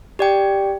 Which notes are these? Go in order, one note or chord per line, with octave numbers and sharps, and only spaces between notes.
G4 D5 G5